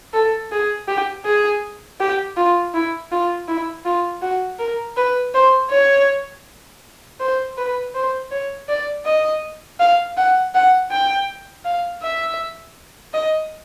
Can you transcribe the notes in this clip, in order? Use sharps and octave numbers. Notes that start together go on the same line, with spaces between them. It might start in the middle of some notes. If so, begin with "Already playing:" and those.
A4
G#4
G4
G#4
G4
F4
E4
F4
E4
F4
F#4
A#4
B4
C5
C#5
C5
B4
C5
C#5
D5
D#5
F5
F#5
F#5
G5
F5
E5
D#5